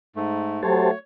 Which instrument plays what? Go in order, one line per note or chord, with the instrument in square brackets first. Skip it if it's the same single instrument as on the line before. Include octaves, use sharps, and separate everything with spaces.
[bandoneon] G#2 A3
[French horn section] F#3 A3 [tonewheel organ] G4 C5 A5 [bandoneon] C#5